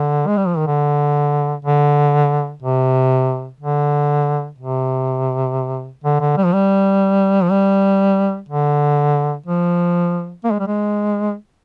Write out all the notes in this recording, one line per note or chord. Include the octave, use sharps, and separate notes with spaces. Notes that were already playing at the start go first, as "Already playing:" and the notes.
Already playing: D3
G#3
G3
F3
D#3
D3
D3
C3
D3
C3
D3
D3
G3
F3
G3
F3
G3
D3
F3
A#3
G#3
G3
G#3